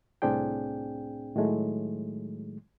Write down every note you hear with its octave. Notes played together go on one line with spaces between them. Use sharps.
C2 A2 C4 D4 G#4 G5
A2 D#3 F#3 G#3 A3